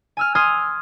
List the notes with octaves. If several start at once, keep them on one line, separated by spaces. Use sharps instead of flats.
G#5 E6 F6
C6 D#6 F6 G#6 C7